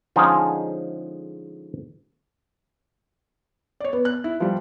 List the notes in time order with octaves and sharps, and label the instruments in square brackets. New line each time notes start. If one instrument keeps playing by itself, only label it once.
[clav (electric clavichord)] D3 F3 G#3 C#4 D#4 G#4
[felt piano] C#5 D5
B3
F#6
E4
F3 G3